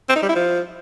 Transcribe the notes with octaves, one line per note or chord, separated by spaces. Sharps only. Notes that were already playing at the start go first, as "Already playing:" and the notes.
C4
D#4
G3
E4
F3